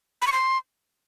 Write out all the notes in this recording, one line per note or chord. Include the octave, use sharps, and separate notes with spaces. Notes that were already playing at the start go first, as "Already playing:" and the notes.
B5
C#6
C6